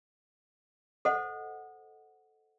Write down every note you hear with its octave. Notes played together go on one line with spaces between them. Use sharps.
A4 C5 D#5 F#5